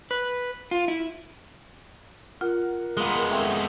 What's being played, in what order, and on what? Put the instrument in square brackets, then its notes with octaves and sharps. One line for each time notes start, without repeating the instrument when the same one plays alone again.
[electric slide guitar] B4
F4
E4
[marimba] F4 [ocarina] A#4 [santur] F#5
[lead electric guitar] G#3 B3 [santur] A#3 B4 C6
[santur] A3 C4 A4